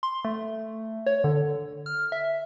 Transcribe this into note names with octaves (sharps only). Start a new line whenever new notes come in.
C6
A3
C#5
D3
F6
E5